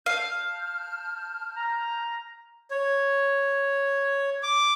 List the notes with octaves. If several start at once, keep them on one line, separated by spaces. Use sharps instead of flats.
F5 A5 F6 G6
A#5
C#5
D6